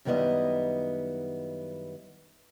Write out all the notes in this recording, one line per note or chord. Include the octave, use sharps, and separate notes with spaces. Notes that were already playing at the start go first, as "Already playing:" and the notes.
F#2 D#3 G3 B3 E4 D#5